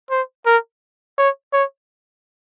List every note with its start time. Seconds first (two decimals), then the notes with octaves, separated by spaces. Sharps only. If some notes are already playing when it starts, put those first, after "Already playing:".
0.10 C5
0.46 A#4
1.18 C#5
1.53 C#5